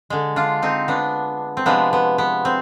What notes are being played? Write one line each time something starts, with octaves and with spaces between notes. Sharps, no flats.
D3 G#3
D4 F4
C4 D#4
B3 D4
C4
C3 F3 G#3 B3 D4
B3
B3
C4